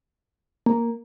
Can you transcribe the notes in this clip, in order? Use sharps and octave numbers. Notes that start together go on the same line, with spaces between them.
A#3